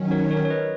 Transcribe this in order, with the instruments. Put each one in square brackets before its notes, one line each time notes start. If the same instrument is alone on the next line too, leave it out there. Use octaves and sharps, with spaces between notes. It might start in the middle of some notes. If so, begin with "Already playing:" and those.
Already playing: [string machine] D#3 F#3 C#4
[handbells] A#4 C#5
A#4 C#5
C#5
B4 D#5